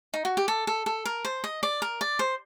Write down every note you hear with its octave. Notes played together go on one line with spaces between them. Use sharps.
D#4
F#4
G4
A4
A4
A4
A#4
C5
D#5
D5
A#4
D5
C5